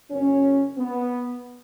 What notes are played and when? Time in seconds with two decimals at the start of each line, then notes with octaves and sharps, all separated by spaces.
0.11 F#1 F#2 D#3 C#4
0.78 B3